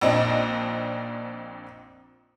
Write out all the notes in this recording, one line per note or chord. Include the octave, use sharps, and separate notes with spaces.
A#1 A#2 C4 D4 D#4